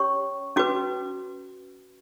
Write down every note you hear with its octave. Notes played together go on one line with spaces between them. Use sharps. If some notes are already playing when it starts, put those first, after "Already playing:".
Already playing: C#4 G4 C#5 C#6
C#4 F#4 B4 D6